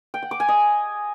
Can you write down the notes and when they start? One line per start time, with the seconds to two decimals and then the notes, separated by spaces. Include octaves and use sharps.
0.14 G5
0.23 F#5
0.31 D6
0.40 G#5
0.49 D#5